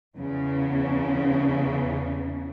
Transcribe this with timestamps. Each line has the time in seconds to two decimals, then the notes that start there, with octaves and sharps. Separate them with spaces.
0.16 E2 C#3